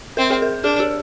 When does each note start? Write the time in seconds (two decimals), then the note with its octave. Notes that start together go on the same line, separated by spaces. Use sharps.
0.17 C4 A#4
0.30 G#4
0.42 A#4
0.64 D4 G#4
0.80 G4